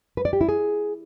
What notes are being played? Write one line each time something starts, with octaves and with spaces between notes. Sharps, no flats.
B4
D5
G4
E4
G#4